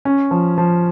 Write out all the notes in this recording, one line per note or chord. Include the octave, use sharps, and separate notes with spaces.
C#4
F3
F3